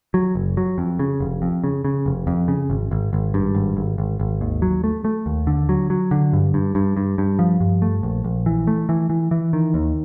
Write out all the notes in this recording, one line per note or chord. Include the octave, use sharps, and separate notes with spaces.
F#3
F#1
F#3
F2
C#3
F1
F2
C#3
C#3
F1
F2
C#3
G#1
G#1
G#1
G2
G#1
G#1
G#1
G#1
D#2
F#3
A3
A3
D#2
D3
F#3
F#3
D3
G2
G2
G2
G2
G2
F3
G2
A3
A#1
A#1
E3
A3
E3
E3
E3
D#3
D#2